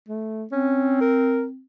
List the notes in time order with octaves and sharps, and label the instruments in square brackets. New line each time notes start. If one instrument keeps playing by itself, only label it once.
[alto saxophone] A3
[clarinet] C4 [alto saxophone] C#4
[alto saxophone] A#4